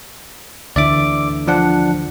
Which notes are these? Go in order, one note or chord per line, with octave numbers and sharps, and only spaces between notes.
D2 D3 E3 D5 E5 D6
F3 D4 F#5